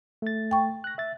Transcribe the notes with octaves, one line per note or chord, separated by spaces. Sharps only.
A3 A6
G5 C#6
F#6 A#6
E5 A6